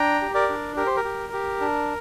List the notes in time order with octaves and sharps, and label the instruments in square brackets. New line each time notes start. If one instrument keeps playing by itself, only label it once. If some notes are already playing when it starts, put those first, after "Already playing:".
Already playing: [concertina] D4 G5 A#5
G4
A#4 D5
D4
G4 A#4
C5
A#4
G4
G4
D4